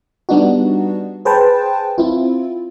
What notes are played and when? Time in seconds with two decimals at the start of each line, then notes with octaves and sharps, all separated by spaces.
0.29 G3 B3 D4 D#4 F#4
1.25 G#4 B4 C5 G5 A5
1.98 C4 E4 F4